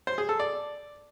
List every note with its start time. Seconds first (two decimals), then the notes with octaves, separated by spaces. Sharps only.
0.07 C5
0.18 G#4
0.29 A4
0.40 D5